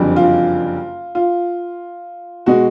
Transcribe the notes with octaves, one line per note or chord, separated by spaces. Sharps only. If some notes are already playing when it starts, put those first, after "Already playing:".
Already playing: F#1 F2 D3 G3
F4
F4
B2 G#3 F#4